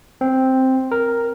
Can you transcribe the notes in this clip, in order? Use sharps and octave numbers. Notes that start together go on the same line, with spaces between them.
C4
A#4